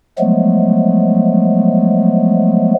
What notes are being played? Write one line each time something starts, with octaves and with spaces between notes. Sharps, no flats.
F3 F#3 G#3 A3 B3